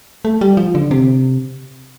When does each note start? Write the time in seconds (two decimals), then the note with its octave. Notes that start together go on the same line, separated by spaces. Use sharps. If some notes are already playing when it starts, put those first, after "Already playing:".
0.25 A3
0.41 G3
0.57 F3
0.75 D3
0.91 C3